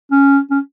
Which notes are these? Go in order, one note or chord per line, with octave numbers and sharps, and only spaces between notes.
C#4
C#4